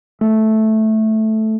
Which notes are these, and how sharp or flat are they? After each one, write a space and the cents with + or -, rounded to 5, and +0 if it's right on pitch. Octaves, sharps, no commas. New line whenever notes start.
A3 -5